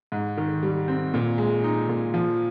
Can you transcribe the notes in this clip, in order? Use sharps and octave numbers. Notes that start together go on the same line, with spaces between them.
G#2
D#3
G3
C4
A#2
G#3
D#4
A#2
F3